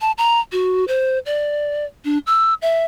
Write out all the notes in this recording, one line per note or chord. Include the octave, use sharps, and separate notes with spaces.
A5
A#5
F#4
C5
D5
D4
E6
E5